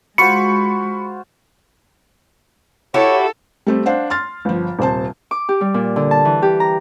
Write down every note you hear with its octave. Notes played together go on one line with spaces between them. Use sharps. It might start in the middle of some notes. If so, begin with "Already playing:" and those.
G#3 F4 F#4 C5 B5 C#6 C#7
E4 F#4 G4 A4 C#5
G3 A3 C4
D4 C5 F5 F#5
C6 F6 A6
G1 F3
D#1 C3 C5 A5
D6
G4
G3
A#2
D3
A5
E3
G4
A#5